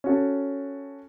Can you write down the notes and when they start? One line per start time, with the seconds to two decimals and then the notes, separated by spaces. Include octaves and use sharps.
0.04 C#4 F#4 A4